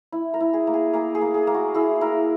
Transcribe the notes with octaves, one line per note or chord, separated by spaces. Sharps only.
E4
A#4
E4
G#4
A#3
G#4
A#3 G#4
G#4
A#3
G#4
A#3
F#4
E4 G#4
E4 A#4